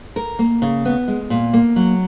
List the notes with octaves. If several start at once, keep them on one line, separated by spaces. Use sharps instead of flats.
A#4
A#3
C#3
B3
G#3
A#2
A#3
F#3